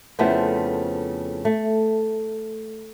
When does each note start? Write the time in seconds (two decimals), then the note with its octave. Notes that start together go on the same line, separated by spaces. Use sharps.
0.19 F2 C#3 A3 B3 E4 C5
1.45 A3